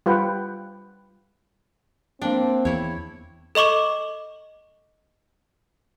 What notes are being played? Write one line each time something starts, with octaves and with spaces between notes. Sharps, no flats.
G3 F4 B4 F#5 G5
A#3 C4 D4 G5
E2 E4 C#5
A4 D#5 C#6 D6 E7